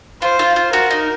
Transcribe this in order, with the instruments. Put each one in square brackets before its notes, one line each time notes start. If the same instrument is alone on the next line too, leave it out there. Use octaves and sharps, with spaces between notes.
[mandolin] F4 [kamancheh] C5
[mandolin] F4
F4
[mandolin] F#4 [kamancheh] A#4
[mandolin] D#4